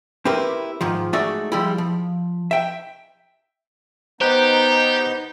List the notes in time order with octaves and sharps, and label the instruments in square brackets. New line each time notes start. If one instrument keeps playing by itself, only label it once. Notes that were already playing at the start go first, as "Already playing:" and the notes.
[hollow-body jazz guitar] C4 E4 G4 A#4 B4
G#2 D#3 F3
G#3 A3 D#4 F#4 D5 E5
F3 G3 G#3 E4
F3
E5 G5
[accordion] B3 D#4 G6 [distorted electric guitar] G4 [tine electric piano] C5 A#5 F#6